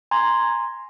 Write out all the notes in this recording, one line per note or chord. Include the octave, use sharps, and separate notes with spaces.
G#5 A#5 C6 G#6